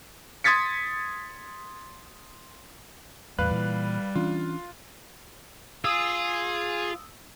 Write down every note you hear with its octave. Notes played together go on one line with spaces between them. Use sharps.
C6 D#6 G#6 A6 B6 C#7
E2 A2 G3 B4 F5 F#6
A#2 E3
E3 C#4 D4 F4
F4 G#4 D#6 E6